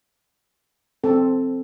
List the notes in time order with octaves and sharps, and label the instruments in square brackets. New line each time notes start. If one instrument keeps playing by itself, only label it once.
[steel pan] C4 A4